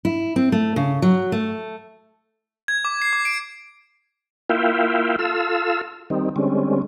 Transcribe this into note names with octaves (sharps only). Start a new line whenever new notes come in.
E4
C4
A3
C#3
F#3
A3
G#6
D6
C7
D6
D7
A#3 E4 F4 E5 F5 G5
F4 A4 F5 E6
D#3 G3 C4 D#4
D3 G3 G#3 C4 C#4